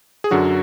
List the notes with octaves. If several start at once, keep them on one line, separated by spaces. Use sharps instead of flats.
G#4
F#2 D3 F#3 F#4